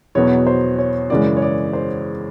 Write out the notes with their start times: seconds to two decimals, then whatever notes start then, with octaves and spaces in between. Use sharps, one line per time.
0.15 E2 B2 F#3 B3 C#5
0.47 C5
0.78 C#5
1.10 F#2 C#3 E3 G#3 D5
1.37 C#5
1.42 D5
1.73 C5